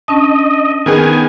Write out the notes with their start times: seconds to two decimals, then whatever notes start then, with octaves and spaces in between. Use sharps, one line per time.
0.08 C#4 D4 D#5 A5
0.86 D#3 B3 G#4 G#5